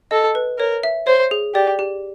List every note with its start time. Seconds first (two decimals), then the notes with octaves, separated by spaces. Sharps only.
0.11 A4 D#5
0.35 B4
0.58 A#4 C#5
0.83 E5
1.07 C5 C#5
1.31 G#4
1.54 G4 D5
1.79 G4